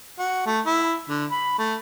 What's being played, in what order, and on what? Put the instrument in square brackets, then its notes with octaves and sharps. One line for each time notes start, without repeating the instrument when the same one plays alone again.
[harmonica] F#4
A3
E4
D3
B5
A3